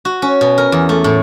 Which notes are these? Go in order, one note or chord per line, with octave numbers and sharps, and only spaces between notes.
F#4
C#4
B2
A#4
E2
A3
A2